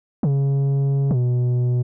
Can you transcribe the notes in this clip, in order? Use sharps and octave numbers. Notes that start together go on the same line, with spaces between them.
C#3
B2